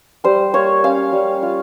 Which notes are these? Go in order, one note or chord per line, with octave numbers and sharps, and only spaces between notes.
G3 C5
A#3 C#5
C#4 F5
G3
F4